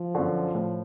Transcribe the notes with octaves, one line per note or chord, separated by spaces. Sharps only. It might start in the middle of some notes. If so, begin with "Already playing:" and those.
Already playing: F3
F#2 D3
A2